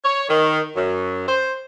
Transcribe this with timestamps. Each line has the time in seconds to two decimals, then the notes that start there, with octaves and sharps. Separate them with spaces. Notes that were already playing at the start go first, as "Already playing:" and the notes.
0.05 C#5
0.29 D#3
0.75 F#2
1.27 C5